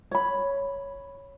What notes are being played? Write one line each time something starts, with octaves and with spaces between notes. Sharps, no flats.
C#5 B5